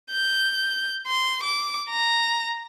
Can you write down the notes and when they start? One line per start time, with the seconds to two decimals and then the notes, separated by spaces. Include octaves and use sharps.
0.11 G6
1.07 C6
1.43 D6
1.89 A#5